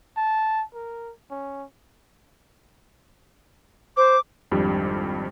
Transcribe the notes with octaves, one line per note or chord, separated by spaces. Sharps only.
A5
A#4
C#4
C5 D6
G#1 F2 G3 D4 G4